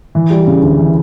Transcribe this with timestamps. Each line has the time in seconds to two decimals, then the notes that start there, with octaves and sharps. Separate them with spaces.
0.15 E3
0.31 G3
0.47 C#3
0.63 D2
0.79 E3